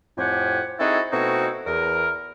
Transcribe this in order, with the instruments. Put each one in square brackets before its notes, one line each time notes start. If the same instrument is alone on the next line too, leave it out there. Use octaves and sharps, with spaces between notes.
[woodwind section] F2 A2 C4 G4 F#5 G#5
C4 D#4 E4 F#4 G#4 A4
B2 A3 C4 D#4 E4 F#4
E2 A#4